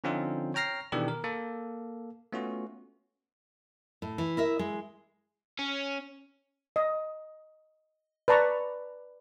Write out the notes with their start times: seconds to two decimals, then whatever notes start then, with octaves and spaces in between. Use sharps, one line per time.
0.04 D3 F3 C4 C#4 D#4 F4
0.54 C#5 G5 A#5 F6 A#6 C7
0.92 B2 D#3 E3 D4 G4 A4
1.08 A#4
1.24 A#3 A4
2.32 A3 B3 C#4 F4 F#4
4.02 A2
4.18 E3
4.37 E4 A#4 E5
4.59 G#3
5.59 C#4
6.76 D#5
8.28 B4 D5 A5 A#5 C#6